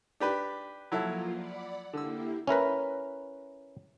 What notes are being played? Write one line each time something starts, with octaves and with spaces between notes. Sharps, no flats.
D4 G4 B4
F3 F#3 A#3 E4 F4 A4
D5 F#5 B5
D3 A#3 E4 G4 E6
C#4 E4 A#4 B4